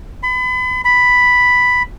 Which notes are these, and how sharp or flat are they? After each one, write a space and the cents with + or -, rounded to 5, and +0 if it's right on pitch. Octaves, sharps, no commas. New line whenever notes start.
B5 +35
B5 +5